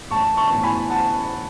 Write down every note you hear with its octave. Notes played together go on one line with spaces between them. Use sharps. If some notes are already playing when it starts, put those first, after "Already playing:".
A1 A5 C#6
A5 C#6
A2 E3 B3
G#5 B5
F#5 A5